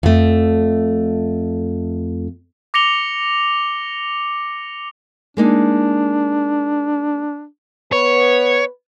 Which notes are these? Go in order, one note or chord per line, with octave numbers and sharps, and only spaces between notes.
F2 A3
D6 A#6 C#7 F7 G7
G#3 A#3 D4 D#4
B3 B4 C#5